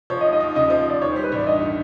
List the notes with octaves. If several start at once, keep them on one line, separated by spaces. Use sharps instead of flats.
F3 C#5
D#5
D#2
D#5
D#2
C#3 D#5
D#5
F3
D#5
D#2 D5
D#3 C#5
G3 C5
B4
A1 D5
G2 D#5
D#3